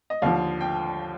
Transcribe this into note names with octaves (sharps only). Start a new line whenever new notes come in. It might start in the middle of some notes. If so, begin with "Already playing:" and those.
D#5
D#2 D3 F3 F5
G5